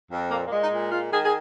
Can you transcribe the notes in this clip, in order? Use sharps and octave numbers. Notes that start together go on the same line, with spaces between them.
F2
A#2 A#3
A#3
G#3
D#4
A#2
G#3 F4
D#3 G#4
G#4